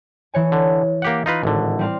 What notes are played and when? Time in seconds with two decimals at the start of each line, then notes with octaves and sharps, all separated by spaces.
0.34 E3 C#5 G#5
0.52 D3
1.02 A#3 G4 F#5
1.26 D#4 F4 B4
1.43 G#1 A2 D3
1.79 G3 C4 F5